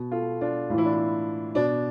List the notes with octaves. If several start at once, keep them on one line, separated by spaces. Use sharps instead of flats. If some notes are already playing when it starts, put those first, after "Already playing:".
Already playing: B2
F4 A4
D4 F4
A2 E3 E4 F4
D4
E4
B2 D4